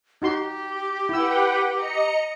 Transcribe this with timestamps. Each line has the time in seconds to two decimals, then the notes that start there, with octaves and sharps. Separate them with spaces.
0.22 D#4 F#4 G4 C6
1.09 E4 B4 F#5 G5 E6
1.75 D#5 A#5 C#7